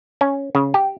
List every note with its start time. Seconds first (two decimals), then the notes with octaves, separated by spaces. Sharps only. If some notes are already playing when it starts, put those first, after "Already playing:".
0.21 C#4
0.55 C#3
0.74 G4